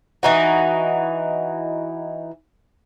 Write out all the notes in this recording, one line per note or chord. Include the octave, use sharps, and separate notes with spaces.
E3 D#4 F#4